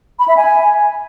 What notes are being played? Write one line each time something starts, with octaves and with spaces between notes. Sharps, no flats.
B5
E5
G#5